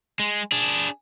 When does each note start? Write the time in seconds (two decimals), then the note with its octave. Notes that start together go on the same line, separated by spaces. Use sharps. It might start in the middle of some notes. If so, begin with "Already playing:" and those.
0.19 G#3
0.52 D4 G#4